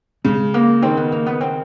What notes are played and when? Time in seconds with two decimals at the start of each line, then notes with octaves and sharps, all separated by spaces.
0.25 C#3 G#3
0.54 A#3
0.82 D#3 C4
0.97 B3
1.12 A#3
1.26 B3
1.41 C4